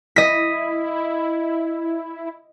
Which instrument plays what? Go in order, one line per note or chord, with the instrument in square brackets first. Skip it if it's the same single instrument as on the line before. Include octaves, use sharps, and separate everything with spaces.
[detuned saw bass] E4 [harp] D#5 B6